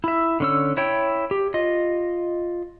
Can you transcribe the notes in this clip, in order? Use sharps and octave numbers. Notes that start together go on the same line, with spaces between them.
E4 E5
D3 C#4 E6
E4 C#5 G5
G4
F4 D#5